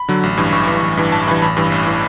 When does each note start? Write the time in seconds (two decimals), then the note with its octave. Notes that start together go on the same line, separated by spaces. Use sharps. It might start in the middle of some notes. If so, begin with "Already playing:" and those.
Already playing: B5
0.08 D3 F#3
0.23 A1
0.37 G2 E3
0.52 A1 C#6
0.67 G2 E3
0.82 A1
0.97 G2 E3
1.12 A1 A5
1.27 G2 E3 B5
1.42 A1 B5
1.57 G2 E3
1.72 A1
1.87 E3